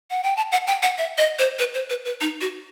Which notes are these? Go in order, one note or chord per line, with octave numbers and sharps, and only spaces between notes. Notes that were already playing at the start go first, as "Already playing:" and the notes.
F#5
G5
A5
F#5
G5
F#5
E5
D#5
C5
B4
C5
B4
B4
D#4
F#4